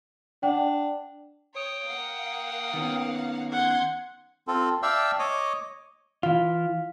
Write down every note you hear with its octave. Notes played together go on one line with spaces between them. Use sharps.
D4 F#5 G5
C#5 G5 D#6
A#3 F5 F#5
D#3 B3 C#4
F#5 C6 G6 G#6
C4 F4 A4
D5 E5 F5 G5 A5 E6
C#5 D#5 D6
E3 F4 F5